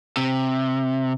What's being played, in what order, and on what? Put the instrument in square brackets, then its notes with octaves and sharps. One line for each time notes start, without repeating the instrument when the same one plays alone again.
[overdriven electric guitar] C3